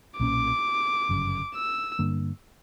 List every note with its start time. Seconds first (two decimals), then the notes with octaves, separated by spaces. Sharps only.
0.19 B1 A#2 A#3 C#4 D6
1.09 G1 F#2 C#3
1.54 E6
1.99 G2 D3 A#3